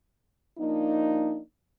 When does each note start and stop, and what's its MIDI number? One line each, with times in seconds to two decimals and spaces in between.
0.58 1.39 53
0.58 1.39 58
0.58 1.39 62
0.58 1.39 63